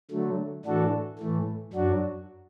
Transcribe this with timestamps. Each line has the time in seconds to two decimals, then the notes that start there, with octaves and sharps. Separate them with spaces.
0.11 D3 F#3 A3
0.65 A2 E3 D4 F#4 A4
1.19 A2 E3 A3
1.73 F#2 F#3 D4 F#4